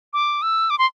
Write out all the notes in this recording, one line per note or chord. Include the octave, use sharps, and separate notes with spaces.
D6
E6
D6
C6